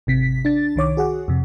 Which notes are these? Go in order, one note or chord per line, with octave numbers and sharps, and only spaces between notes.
G#1 C3 B6
D4 A6
C2 D#3 C#5 D6
F#4 G#4 F#5
F2 C3